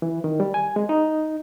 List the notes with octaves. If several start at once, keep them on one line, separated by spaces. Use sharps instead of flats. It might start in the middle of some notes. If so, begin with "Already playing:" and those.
E3
D#3
G3
G#5
G#3
D#4